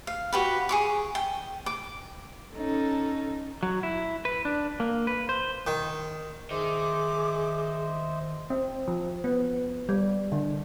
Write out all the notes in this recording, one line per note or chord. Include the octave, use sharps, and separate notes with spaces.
F5
F#4 G4 B4
G#4 C#6 D6
G5
D6
C#4 D#4 A4
F#3
E4
B4
D4
A#3
B4
C5
D#3
D#3 G#4 C5 D#5 E5 D6
C4
F3
B3
G3
D3